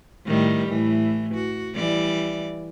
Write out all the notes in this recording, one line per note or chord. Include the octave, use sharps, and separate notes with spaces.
A2 D#3 G3
A2 E3
F#4
E3 G3 D5